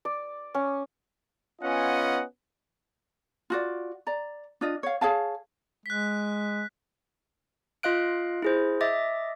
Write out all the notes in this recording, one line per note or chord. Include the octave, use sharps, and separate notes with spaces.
D5
C#4
B3 C#4 F4 D#5 F#5 G#5
F4 F#4 D5
D5 A#5
D4 F4 D#5
C#5 F5
G#4 C#5 F5 A5
G#3 F#6 B6
F4 D#5 F5 F#6 D7
E4 G#4 C5
D#5 E5 D6 A6